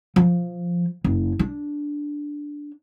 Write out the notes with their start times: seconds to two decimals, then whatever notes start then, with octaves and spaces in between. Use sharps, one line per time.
0.16 F3
1.04 F#1
1.39 D4